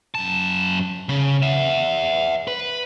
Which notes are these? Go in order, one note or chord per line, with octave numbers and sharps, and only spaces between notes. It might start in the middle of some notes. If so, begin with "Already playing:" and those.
F#2 A5
C#3
E5 F#5
B4